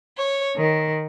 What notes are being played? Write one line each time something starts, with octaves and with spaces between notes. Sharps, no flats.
C#5
D#3